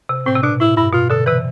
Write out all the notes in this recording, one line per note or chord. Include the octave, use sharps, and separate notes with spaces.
C3
A2 C4
C3
B2 D4
A2 E4
G2 E4
B2 F4
B2 D3 A4
C3 E3 B4